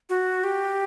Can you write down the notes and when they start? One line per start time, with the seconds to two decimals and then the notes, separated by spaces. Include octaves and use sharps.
0.09 F#4
0.44 G4